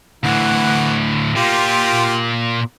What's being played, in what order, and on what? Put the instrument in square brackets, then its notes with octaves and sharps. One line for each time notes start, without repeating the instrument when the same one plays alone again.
[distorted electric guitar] D2 A2 [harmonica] E3 F#5
[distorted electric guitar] A#2 [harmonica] F4 G4